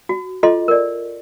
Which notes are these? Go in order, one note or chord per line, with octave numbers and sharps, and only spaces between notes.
F#4
F4 A4 D#5 C6
A#4 D5